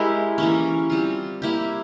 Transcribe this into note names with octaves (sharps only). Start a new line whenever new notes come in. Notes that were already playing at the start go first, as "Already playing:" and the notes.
Already playing: G#3 E4 G4 A#4
E3 A#3 C#4
G3 C4 F4
A#3 E4 G4